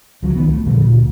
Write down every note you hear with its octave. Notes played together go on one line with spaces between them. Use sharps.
C#2 F3 F#3
A1 D#3 B3
A3
A#2 D3 F3 G3
D2 A#2
D2